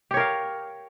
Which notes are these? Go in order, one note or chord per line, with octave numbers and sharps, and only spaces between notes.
G4 A#4 C#5 F5